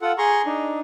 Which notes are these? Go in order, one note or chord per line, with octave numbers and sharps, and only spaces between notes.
F4 A4 F#5
G#4 A#5 C6 C#6
D4 D#4